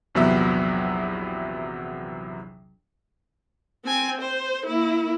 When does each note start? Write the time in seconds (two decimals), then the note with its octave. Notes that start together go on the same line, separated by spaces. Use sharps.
0.15 A#1 E2 C3 F#3 B3 E5
3.85 C4 G#5
4.21 C5
4.66 A#3 E4